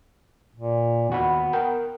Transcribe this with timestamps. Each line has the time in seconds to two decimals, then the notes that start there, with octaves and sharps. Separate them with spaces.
0.55 A#2
1.09 D#2 B3 F#4 B5
1.53 A#4 G5